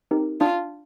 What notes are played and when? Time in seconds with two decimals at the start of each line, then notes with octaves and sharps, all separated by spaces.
0.11 C4 D#4 G4 A#4
0.41 D4 F4